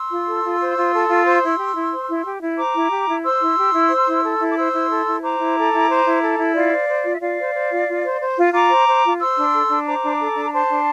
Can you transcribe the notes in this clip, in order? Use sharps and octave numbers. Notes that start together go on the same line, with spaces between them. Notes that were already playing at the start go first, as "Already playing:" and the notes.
Already playing: C6 E6
F4
A4
F4
C5
F4
A4
F4
C5
E4
G4
E4
C5
E4
G4
E4
C5 A#5 D6
E4
G4
E4
C5 C6 E6
E4
G4
E4
C5
E4
A4
E4
D6
C5 C6 E6
E4
A4
E4
C5 A#5 D6
E4
A4
E4
C5
E4
A4
E4
F4 D5 F5
C5
C5
F4
E5
F4 D5 F5
C5
C5
F4
F4
C5
C5
F4
F4 A#5 D6
C5
C5
F4
C5 C6 E6
D4
A4
D4
C5 A#5 D6
D4
A4
D4
A#5
C5 A5 C6
D4